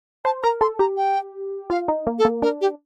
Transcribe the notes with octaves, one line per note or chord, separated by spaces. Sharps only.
C5 A5
A#4 A#5
A4 C6
G4 A#5
G5
F4 F5
D#4
A#3
A4
A#3
D4 A#4
G4